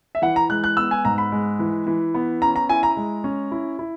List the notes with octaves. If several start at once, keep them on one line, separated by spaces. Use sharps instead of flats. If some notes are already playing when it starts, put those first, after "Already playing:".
E5
E3 F#5
A#5
G#3 F#6
F#6
B3 E6
G#5
G#2 A#5
B5
G#3
E3
E3
B3
C#4 A#5
A#5
E4 G#5
A#5
G#3
C#4
E4
E4